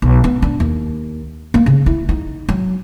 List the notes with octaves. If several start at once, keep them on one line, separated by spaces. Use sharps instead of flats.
B1
B3
D4
D#2
A#3
C#3
E4
D#4
F#3